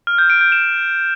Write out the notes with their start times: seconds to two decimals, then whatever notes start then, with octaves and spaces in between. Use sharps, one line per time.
0.07 F6
0.18 G6
0.30 D7
0.41 G6
0.52 E7